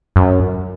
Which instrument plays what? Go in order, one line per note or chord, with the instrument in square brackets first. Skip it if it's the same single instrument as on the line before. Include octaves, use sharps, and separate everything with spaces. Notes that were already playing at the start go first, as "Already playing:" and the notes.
[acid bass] F#2